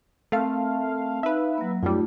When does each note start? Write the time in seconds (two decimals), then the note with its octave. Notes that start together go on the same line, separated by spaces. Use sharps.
0.32 A3 C4 A#4 F5 A5
1.23 D#4 B4 E5 F5
1.58 F#3 A#3
1.83 F#2 G3 A3 D#4 F4